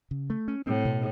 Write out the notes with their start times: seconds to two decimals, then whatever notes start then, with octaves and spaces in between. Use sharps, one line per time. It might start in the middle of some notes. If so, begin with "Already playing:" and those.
0.11 C#3
0.30 A3
0.48 C#4
0.67 A2 C4
0.85 B2